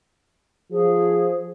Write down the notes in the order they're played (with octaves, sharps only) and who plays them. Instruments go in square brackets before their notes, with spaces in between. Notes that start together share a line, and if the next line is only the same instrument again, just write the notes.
[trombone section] F3 [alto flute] G#4